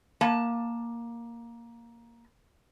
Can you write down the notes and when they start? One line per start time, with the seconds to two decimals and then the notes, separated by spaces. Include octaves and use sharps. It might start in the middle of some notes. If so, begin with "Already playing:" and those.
0.21 A#3 A5